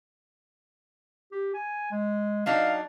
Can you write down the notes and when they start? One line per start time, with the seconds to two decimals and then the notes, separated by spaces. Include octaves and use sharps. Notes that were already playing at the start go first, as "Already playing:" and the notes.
1.32 G4
1.54 G#5
1.91 G#3
2.46 F#3 D4 D#4 F5